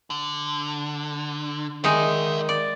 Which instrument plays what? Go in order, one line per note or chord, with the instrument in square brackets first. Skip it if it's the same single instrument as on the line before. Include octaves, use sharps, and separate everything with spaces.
[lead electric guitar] D3
[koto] D#3 G#3 D#4 [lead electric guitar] D5 E5
[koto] D5